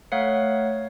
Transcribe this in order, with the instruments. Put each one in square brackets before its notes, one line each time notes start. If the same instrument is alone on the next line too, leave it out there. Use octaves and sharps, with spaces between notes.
[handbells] A3 C#5 F5 F#5